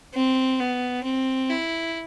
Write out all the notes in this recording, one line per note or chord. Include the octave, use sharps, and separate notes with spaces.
C4
B3
C4
E4